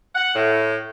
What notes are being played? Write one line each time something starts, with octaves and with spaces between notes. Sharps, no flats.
F#5
A2